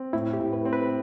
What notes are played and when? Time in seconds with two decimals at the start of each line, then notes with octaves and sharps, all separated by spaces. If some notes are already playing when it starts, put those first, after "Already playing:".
Already playing: C4
0.13 A2 E4
0.33 G4
0.40 A2
0.53 B4
0.65 C4
0.73 B4